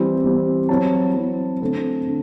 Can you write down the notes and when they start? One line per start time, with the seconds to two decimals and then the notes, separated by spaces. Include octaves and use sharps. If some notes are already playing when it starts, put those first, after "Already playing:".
Already playing: E3 G3 C4
0.24 E3 G3 C4
0.69 F#3 C4 E4 A5
1.15 F#3 C4 E4
1.61 D3 A3 C4
2.07 D3